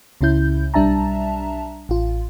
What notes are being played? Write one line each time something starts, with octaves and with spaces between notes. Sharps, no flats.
C#2 C#3 C#4 E4 G6
B1 G3 D4 E5 A5 A#5
A1 F4